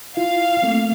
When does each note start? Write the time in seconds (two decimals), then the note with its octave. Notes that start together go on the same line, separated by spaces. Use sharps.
0.17 E4 F4 F5
0.62 A3 A#3 C4